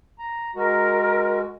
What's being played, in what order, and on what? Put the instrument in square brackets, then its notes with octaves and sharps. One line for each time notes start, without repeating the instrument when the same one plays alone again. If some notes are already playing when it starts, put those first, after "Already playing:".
[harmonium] A#5
[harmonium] G#3 F#4 [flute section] A#4